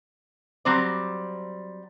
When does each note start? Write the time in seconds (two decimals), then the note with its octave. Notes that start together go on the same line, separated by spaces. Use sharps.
0.65 F#3 G3 C4 C5 D5